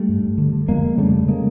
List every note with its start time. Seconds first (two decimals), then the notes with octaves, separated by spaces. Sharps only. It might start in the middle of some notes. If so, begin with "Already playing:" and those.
Already playing: G3 A3
0.09 G2
0.23 G2
0.38 D3
0.53 D3
0.68 F2 G#3 A#3
0.83 F2
0.98 C#3 G3 A3
1.13 C#3
1.28 C#3 G#3 A#3